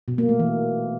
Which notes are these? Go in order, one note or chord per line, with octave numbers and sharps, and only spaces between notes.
B2
A#3
A3
E3